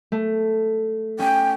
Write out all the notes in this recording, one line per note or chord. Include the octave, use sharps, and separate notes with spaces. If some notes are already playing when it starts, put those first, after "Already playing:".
A3
C#4 G5